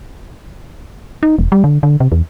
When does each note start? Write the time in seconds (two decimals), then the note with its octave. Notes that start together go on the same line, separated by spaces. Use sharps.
1.23 D#4
1.39 E1
1.52 G3
1.64 D3
1.83 D3
2.00 C3
2.12 E2